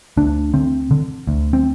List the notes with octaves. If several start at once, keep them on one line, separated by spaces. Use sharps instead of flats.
D2 D4
D3 C4
D3
D2
C4